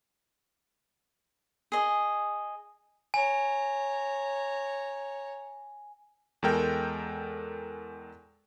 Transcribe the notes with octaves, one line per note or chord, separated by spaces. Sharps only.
G#4 D#5
C#5 G#5 A#5
E2 G#3 A4 A#4 G5